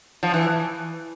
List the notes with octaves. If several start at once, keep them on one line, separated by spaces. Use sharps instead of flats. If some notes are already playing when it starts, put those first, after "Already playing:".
F3
E3